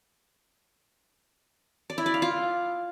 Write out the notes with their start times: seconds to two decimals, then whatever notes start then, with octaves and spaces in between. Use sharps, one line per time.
1.90 D5
1.98 E4
2.06 D5
2.14 F5
2.22 F4